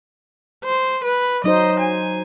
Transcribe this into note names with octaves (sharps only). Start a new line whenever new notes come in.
C5
B4
F#3 D#4 C5 D#5
G#5